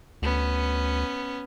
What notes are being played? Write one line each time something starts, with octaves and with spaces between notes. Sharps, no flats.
D2 B3 C#4